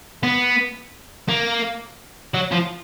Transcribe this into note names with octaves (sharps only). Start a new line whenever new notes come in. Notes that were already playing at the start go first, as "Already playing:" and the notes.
B3
A#3
F#3
F3